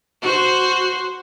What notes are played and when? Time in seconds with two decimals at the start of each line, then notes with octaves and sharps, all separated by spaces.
0.22 F#4 C5